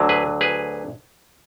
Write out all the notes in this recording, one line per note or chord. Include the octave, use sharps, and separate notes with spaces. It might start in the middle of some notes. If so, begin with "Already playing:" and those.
Already playing: D2 D3 F#3
G#4 B4
G#4 B4